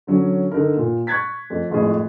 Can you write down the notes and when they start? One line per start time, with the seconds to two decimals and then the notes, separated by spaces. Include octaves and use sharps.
0.07 D3 F#3 C#4
0.51 D3 D#4 A#4
0.77 A#2
1.07 C#6 F#6 G#6 A6 B6
1.50 F2 A3
1.70 G#1 F2 A2 E4 G#4